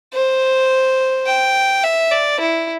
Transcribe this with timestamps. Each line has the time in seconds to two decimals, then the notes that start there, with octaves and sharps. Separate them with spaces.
0.14 C5
1.26 G5
1.83 E5
2.11 D5
2.40 E4